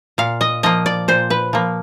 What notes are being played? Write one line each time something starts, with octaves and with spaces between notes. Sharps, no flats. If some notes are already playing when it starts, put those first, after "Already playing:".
A#2 F5
D#5
F3 A#3 D#5
D5
A#2 C5
B4
F3 A#3